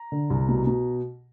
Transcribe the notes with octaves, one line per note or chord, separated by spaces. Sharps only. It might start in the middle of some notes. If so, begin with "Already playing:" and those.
Already playing: A#5
D3
C2
B2
B2